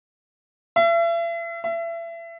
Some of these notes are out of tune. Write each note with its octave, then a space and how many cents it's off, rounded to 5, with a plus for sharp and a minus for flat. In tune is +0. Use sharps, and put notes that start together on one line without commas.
E5 +40
E5 +30